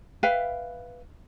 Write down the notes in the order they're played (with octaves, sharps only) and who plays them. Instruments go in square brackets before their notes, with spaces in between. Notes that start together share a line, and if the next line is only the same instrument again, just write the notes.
[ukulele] B4 E5 F5 G5